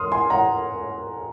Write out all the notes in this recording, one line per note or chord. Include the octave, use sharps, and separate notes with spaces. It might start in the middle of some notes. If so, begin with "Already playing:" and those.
Already playing: C6 D#6 F6
G#5 C6
F#5 A#5